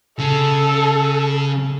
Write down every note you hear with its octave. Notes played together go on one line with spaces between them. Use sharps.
C#3 A4